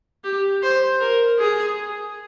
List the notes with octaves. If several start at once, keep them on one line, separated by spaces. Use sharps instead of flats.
G4
C5
A#4
G#4